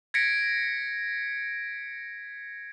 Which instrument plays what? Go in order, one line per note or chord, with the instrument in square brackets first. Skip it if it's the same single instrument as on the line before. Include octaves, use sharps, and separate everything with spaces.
[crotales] G#6 A#6 B6 C#7 D7